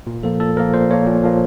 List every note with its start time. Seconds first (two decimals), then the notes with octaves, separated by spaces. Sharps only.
0.07 A#2
0.23 F3 A#3 A4
0.40 A#2 A4
0.56 F3 A#3 A#4
0.74 A#2 C5
0.90 F3 A#3 C#5
1.07 A#2
1.24 F3 A#3